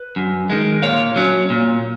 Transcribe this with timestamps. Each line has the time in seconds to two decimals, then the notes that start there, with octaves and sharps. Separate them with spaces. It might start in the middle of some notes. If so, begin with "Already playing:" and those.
Already playing: B4
0.16 F#2
0.50 D#3 G#3
0.82 A#2 C#5 F5
1.16 F#3 C#4
1.50 A#2